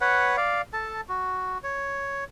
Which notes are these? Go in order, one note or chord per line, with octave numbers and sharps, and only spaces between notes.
B4 C#5 F#5
D5 F5
A4 A5
F#4
C#5